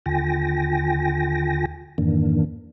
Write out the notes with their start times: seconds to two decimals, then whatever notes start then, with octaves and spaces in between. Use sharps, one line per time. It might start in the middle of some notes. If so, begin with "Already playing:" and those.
0.06 D#2 D3 F4 G5 G#5 A#6
1.98 F2 G#2 D#3 E3 A#3 D4